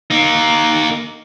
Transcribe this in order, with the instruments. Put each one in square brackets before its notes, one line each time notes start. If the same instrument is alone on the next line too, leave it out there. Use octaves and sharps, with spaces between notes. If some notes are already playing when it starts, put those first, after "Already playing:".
[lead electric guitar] A#3 D#4